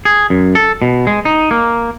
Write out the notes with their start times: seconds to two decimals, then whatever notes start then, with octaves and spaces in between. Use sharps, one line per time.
0.05 G#4
0.30 F#2
0.55 A4
0.82 B2
1.07 G#3
1.25 D#4
1.51 A#3